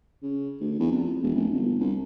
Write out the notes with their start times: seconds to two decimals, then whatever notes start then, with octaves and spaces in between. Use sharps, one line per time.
0.22 C#3
0.61 D2
0.79 E2
0.92 F2
1.23 E1
1.35 F1
1.54 G1
1.79 C2